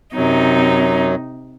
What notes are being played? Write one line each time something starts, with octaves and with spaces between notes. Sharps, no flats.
F#2 C3 F#3 D#4